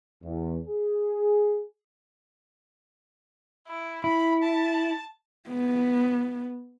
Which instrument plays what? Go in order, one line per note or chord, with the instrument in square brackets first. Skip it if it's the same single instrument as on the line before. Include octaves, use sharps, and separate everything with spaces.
[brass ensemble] E2
G#4
[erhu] E4
[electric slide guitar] E4 [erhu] B5
[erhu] A5
[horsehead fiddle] B3